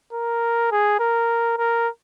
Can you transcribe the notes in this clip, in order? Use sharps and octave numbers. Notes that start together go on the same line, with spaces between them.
A#4
G#4
A#4
A#4